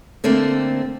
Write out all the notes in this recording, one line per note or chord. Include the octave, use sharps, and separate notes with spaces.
D3 A3 A#3 C4